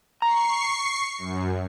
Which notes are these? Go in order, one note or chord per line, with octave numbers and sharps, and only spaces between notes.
A#5 C#6 C7
F#2